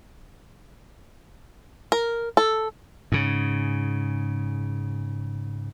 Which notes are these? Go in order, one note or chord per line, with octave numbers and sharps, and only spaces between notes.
A#4
A4
G#2 C#3